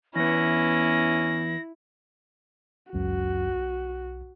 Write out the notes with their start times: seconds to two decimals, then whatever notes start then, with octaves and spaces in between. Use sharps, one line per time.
0.16 E2 B3 C#4 E4 A#6
2.93 G#1 C#2 F#2 F#4
3.49 B1